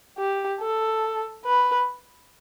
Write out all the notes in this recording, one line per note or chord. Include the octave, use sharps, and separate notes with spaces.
G4
A4
B4